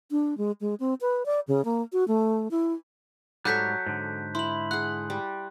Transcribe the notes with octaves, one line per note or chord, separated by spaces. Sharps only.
D4
G#3
G#3
C4
B4
D5
C#3
A#3
F#4
A3
E4
G#2 F#3 G3 A4 C#5 F#6 G6 B6
G#2 D3
E4 C6 F#7
G#4 F#5 F#6
G3